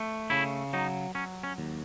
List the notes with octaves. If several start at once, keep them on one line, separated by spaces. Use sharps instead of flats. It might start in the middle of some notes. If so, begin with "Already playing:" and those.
Already playing: A3
C#3 E4
F#3 D#4
F#3 C#4
C#4
D#2